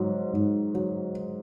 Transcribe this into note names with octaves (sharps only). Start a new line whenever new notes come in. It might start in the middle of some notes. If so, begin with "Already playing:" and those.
Already playing: G#2 F#3
G#2
F#3